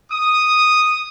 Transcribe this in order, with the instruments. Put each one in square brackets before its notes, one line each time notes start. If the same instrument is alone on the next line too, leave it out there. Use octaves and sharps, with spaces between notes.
[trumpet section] D#6